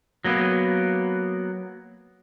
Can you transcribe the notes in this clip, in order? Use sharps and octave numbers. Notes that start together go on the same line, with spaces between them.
F#3 A#3 B3